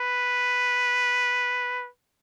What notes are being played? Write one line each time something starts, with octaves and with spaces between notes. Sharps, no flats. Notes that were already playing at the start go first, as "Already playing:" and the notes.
Already playing: B4